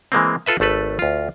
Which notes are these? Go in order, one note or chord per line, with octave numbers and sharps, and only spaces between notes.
E3 G#3 A#3 C4
F4 A4 B4 E5
G#1 A3 A4 B4
D2 F4